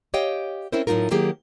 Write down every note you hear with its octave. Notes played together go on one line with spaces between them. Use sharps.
G4 C#5 D#5 F5 G5
C4 C#4 E4 A#4 C5
A2 F#3 A#3 D#4 F4 A#4
D#3 F#3 A#3 G4 G#4